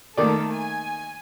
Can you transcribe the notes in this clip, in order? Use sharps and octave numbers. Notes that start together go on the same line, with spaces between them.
D#3 A3 A#3 A4 D5
G#5